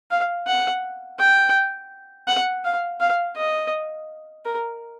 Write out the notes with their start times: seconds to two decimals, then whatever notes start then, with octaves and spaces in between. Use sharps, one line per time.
0.11 F5
0.47 F#5
1.19 G5
2.28 F#5
2.64 F5
3.00 F5
3.36 D#5
4.45 A#4